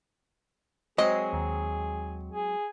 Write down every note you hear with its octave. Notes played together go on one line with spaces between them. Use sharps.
F#3 G#3 C4 G#4 D#5
D#2
G#4